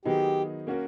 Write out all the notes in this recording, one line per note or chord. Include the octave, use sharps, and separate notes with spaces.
D#3 F#3 B3 D#4 G4 G#4
A#3 C#4 F#4 A#4